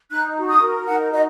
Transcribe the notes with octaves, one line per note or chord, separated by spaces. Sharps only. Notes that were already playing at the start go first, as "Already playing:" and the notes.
D#4 F#6
F#4
D#6
A#4
D#4 F#5
F#4 D#5